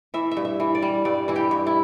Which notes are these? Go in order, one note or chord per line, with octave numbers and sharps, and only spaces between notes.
E3 E5
E5
G2
E5
E3
D5
G3
G2 D5
E3 E4
G4
G2
E4